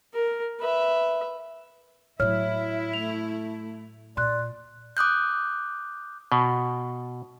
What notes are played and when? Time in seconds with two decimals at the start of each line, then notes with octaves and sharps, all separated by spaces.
0.13 A#4
0.60 B4 E5
2.20 A2 F#3 E4 C#5 E5 F6
2.94 A3 F7
4.17 A#2 D5 C6 F#6
4.97 D6 D#6 F#6 G6
6.32 B2